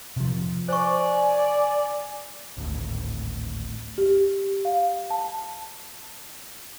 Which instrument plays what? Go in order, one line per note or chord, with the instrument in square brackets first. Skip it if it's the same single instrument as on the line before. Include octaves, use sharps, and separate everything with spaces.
[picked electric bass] C3 F3
[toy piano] C5 C#6 [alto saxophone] D5 [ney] G#5
[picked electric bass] G#1 D2 A2
[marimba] G4
F5
A5